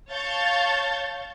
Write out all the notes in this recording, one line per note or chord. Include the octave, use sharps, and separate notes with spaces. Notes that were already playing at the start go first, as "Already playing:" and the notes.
C#5 F5 A5 C#6 G6 A6